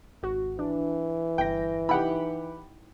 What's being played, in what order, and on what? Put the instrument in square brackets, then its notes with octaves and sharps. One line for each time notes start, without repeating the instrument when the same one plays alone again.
[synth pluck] G#1 F#4
[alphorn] E3 [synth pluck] D4
[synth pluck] G1 A#6 [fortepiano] G5
[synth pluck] D#4 E4 G5 [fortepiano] G4 F#5 B5